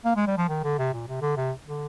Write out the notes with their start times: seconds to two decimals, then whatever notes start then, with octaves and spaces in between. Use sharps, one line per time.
0.05 A#3
0.16 G#3
0.27 G3
0.37 F3
0.49 D#3
0.64 D3
0.79 C3
0.94 A#2
1.08 C3
1.22 D3
1.37 C3
1.67 D3